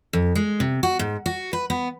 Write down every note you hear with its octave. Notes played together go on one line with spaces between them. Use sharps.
F2
G#3
C3
F#4
G#2
F#4
B4
B3